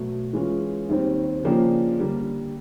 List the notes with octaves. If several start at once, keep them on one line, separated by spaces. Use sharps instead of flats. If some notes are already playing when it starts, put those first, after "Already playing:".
Already playing: B2 F#3 A3
E3 G#3 C#4 F4
D#2 D#3 G3 C4
C#3 F3 A#3 D4 G4
D3 G3 A#3